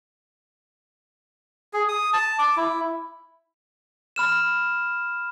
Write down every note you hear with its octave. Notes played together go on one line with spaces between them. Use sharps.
G#4
D#6
A5
D6
E4
B5 F6 E7